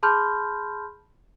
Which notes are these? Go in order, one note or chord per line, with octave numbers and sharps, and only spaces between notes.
G#4 A5 B5 C6 F6 G6